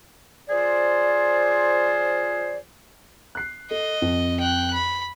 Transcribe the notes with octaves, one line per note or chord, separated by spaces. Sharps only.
F3 F4 G#4 C5 D5
F#6 C7
A4 D#5
F2
G5 F#6
B5